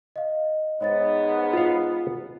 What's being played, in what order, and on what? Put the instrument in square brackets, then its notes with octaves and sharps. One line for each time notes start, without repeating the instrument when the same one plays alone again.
[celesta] D#5 F5
[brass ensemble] G#2 B3 [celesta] C#5 D#5 A6
[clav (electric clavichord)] F4 F5